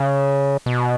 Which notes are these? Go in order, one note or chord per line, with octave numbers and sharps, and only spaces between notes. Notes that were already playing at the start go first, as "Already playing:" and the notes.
Already playing: C#3
B2